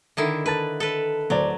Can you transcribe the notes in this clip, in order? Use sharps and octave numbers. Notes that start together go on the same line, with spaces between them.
D3 D#3 E4
A#4 B4 A5 A6
A4 B4
D1 F#3 C5 D5